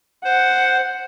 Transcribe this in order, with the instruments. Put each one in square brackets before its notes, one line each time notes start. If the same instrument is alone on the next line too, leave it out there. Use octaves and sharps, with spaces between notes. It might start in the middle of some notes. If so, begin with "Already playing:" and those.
[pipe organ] C5 [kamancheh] F#5